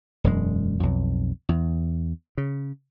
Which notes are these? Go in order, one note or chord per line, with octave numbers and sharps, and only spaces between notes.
E1 F#2 G#3
B1 F2
E2
C#3